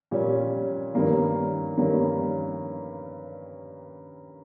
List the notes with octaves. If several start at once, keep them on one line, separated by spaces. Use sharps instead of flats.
A#2 G3 C#4
G2 D#3 G3 A#3 C#4
G2 D#3 G3 A#3 C#4